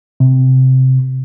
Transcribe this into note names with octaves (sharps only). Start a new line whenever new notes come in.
C3